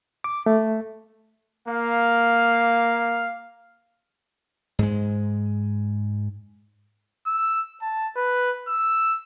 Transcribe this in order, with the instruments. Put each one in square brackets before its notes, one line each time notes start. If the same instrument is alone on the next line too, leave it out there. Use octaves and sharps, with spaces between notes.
[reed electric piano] D6
A3
[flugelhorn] A#3 [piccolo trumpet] F5
[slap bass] G#2 G#3
[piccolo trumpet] E6
A5
B4
E6